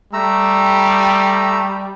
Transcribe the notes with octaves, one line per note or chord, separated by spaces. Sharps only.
G3 A3 A#5 E6